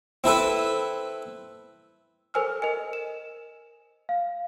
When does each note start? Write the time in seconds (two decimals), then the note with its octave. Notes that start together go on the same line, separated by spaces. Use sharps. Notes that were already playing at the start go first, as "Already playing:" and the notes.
0.24 C4 E4 A4 B4
2.34 A4 A#4 C5 G#5 E6 F6
2.62 A#4 D#5 G#5
2.93 E7
4.09 F5